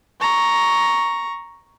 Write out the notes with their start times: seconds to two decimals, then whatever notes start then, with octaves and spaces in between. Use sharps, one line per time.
0.21 A#5 C#6